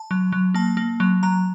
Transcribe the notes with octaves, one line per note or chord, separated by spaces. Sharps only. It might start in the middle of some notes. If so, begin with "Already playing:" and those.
Already playing: A5
F#3
F#3
A#3 A5
A#3
F#3
F#3 A#5